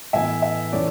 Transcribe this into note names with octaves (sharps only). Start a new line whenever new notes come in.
A2 E3 B3 E5 G#5
E5
A2 E3 A3 C#4 D5